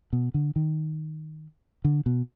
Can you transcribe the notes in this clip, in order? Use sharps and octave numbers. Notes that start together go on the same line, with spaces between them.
B2
D3
D#3
D3
B2